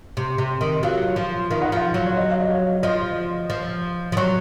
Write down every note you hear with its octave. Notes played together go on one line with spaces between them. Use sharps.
C3
C3
D#3
F#3 F4 F5
F3
D#3 F5
F#5
F3 F4 F5
F#3
C#5
D#5
F5
D#5
C#5
F3 D#5
F3
F3
F#3 C#5 C#6